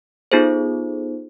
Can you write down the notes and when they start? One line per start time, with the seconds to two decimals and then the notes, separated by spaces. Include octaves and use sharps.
0.32 B3 D#4 F4 G#4 A4 C5